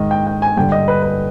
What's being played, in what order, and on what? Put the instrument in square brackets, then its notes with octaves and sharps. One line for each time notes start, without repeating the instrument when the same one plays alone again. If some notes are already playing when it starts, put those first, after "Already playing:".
Already playing: [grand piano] G#2 D#3 D#5
G5
G5
G#5
G2 D3 G5
D#5
B4
B4